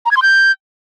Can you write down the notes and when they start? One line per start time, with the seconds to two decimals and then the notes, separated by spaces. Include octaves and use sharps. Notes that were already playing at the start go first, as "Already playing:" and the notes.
0.06 A#5
0.11 G#6
0.17 C6
0.22 G6